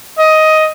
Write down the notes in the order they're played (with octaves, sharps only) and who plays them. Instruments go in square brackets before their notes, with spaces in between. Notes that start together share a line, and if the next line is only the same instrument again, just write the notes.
[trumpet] D#5